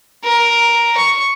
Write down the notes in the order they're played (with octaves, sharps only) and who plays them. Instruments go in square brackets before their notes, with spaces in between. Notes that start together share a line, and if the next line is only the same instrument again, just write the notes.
[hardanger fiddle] A#4
C#6